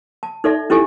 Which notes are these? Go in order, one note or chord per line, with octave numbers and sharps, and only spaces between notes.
A5
D#4 A4 D5 E5
C#4 E4 G4 A4 G#5